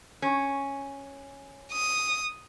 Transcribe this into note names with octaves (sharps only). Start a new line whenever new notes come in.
C#4
D#6